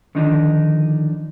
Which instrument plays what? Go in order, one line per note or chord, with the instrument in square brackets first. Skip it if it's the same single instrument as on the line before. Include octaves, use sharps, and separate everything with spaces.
[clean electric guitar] D3 D#3 F3 D4 D#4